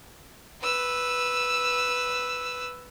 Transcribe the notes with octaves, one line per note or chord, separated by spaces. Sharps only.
B4 E6